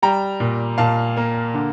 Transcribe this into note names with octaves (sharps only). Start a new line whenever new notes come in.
G3 G5 A#5
A#2
A#2 F5 A5
A#3
D3